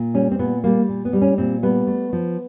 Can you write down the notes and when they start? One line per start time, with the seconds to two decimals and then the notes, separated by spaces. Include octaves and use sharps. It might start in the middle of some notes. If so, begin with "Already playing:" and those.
Already playing: A#2
0.14 G3 C#4
0.32 C4
0.39 A#2 B3
0.64 G3 A#3
0.89 A#2
1.05 B3
1.13 G3
1.22 C#4
1.38 A#2 C4
1.63 G3 B3
1.87 A3
2.13 F3